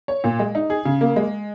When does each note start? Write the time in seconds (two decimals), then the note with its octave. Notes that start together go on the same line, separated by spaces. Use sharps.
0.08 C#5
0.24 A#2
0.39 G#3
0.55 D#4
0.70 G#4
0.85 C#3
1.01 A#3
1.16 G#3